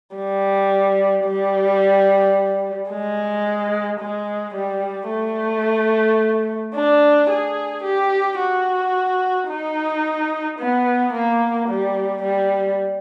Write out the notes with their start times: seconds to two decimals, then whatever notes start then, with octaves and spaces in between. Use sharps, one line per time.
0.16 G3
1.26 G3
2.91 G#3
4.00 G#3
4.55 G3
5.10 A3
6.75 D4
7.30 G#4
7.84 G4
8.40 F#4
9.49 D#4
10.59 B3
11.14 A#3
11.69 G3
12.23 G3